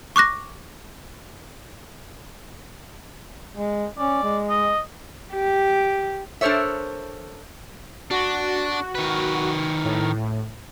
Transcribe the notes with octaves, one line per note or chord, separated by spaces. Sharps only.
C#6 D6 F#6 A#6
G#3
C#4 D5
G#3
D#5
G4
D4 A4 A#4 C5 C#5 E5
D4 F#4
D#3 B4
A2